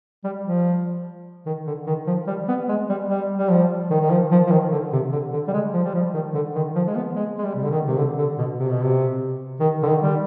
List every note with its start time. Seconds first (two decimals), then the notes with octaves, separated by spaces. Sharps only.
0.24 G3
0.45 F3
1.46 D#3
1.67 D3
1.87 D#3
2.07 F3
2.27 G3
2.48 B3
2.68 G#3
2.89 G3
3.09 G3
3.38 G3
3.50 F3
3.90 D#3
4.00 D#3
4.10 F3
4.31 F3
4.47 F3
4.52 D#3
4.72 D3
4.92 C3
5.12 D3
5.33 D3
5.48 G3
5.53 G#3
5.74 F3
5.84 G3
5.94 F3
6.14 D#3
6.34 D3
6.55 D#3
6.75 F3
6.87 G#3
6.96 B3
7.16 G#3
7.38 G#3
7.43 G3
7.55 C3
7.63 D3
7.71 D#3
7.87 C3
7.97 D3
8.18 D3
8.38 B2
8.58 C3
8.71 B2
8.83 C3
9.60 D#3
9.83 D3
9.87 D#3
10.02 G3